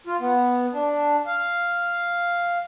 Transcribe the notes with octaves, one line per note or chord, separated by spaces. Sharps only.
F4
B3
D4
F5